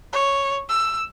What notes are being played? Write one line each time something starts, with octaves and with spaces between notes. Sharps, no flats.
C#5
E6